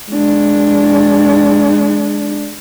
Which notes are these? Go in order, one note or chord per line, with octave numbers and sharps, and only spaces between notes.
G#3 D4